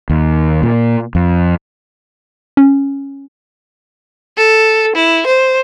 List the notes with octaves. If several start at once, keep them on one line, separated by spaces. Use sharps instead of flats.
D#2
A#2
F2
C#4
A4
E4
C5